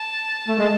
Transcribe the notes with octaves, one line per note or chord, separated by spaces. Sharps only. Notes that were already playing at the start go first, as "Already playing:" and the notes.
Already playing: A5
A3
G#3